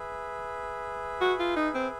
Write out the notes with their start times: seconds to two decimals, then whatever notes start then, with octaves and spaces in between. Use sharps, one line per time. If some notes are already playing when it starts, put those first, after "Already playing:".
Already playing: G#4 B4 E5
1.21 F#4
1.39 F4
1.57 D#4
1.75 C4